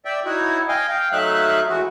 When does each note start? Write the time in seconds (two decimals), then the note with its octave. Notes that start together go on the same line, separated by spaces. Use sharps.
0.05 D5 E5 G5
0.25 D#4 E4 F#4 C#5
0.68 D#5 F5 G5 G#5
0.89 F5 G5
1.12 F#3 A3 D#4 E5 F5 F#6
1.68 E3 G#3 A3 F#4